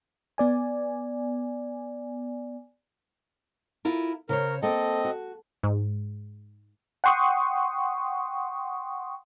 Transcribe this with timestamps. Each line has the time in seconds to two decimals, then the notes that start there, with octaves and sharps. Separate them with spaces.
0.38 B3 D5 G#5
3.85 E4 F4 A#4
4.29 C#3 A#4 C5 C#5
4.62 A#3 C4 A4 D#5
5.05 F#4
5.63 G#2
7.04 F#5 G5 C6 C#6 D#6